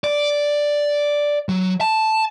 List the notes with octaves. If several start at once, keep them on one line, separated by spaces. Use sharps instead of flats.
D5
F#3
A5